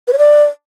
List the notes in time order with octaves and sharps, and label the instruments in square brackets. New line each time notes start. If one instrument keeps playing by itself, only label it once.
[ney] B4
C#5
D5